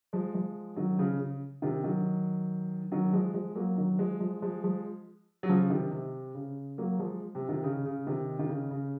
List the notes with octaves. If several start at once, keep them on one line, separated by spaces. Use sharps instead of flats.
F3 G#3
F3 G#3
D#3 F#3
C#3 F3
C#3
C3 D#3
D#3 F#3
D#3 F#3
F3 G#3
F3 G#3
F#3 A#3
D#3 F#3
F3 G#3
F3 G#3
F3 G#3
F3 G#3
F#3
C#3 F3
C3 D#3
C3
C#3
F#3 A#3
F3 G#3
C3
C3 D#3
C#3
C#3
C3 D#3
D#3
C#3
C#3